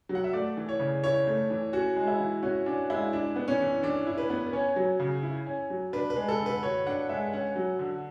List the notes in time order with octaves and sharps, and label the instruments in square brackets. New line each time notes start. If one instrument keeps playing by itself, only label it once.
[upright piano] F#3
[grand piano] F#5
E5
[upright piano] A3 [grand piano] D5
[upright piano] E3
[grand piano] C#5
[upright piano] C#3
[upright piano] E4 [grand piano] C#5
[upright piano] A3
E3
[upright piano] C#4 [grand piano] F#4
[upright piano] G#3
[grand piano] E4
[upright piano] E3
[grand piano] C#4 [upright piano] F#4
[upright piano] C#4 [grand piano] D4
[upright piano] G#3 [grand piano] E4
[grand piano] D4 [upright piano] E4
[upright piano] B3
[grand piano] C#4
[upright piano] E3
[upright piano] E3 [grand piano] D4
[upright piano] E4
[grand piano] B4
[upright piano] B3
[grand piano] B4
[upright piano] C#4 [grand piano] C#5
[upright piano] F#3
C#3
E4
C#4
F#3
[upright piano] D4 [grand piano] B4
[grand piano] B4
[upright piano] G#3
[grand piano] A4
[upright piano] D3
[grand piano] B4
[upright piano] F#4 [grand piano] C#5
[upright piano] D4 [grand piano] F#5
[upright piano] G#3 [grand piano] E5
[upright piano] C#4 [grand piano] F#5
[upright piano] F#3
D3